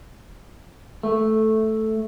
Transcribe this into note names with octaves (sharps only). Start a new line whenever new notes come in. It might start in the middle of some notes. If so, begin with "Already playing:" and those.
A3